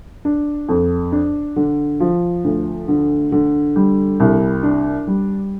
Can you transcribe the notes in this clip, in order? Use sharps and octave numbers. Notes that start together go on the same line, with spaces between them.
D4
F2
D4
D3
F3
D2
D3
D3
G3
C2
D4
G3